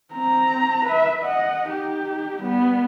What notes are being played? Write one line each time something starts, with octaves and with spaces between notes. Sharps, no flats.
C4 A#5
B4 E5
D#5 F#5
D#4 G4
G3 B3